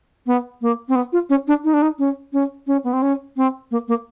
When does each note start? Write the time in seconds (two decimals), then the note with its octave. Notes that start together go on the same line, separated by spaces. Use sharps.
0.26 B3
0.61 A#3
0.88 C4
0.95 B3
1.13 F4
1.30 C#4
1.47 D4
1.64 D#4
1.74 D4
1.82 D#4
1.99 C#4
2.33 C#4
2.67 C#4
2.84 B3
2.93 C4
3.02 C#4
3.37 C4
3.71 A#3
3.88 A#3